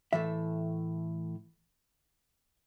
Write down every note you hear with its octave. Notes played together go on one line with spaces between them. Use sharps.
A2 E3 A3 E5